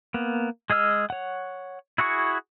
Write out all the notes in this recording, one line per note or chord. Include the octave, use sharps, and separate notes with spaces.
A#3 B3
G#3 G#4 D#5 E6 F6
C#5 F#5
E4 F#4 G#4 C#6